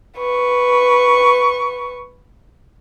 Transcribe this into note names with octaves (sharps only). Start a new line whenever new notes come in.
B4 C#6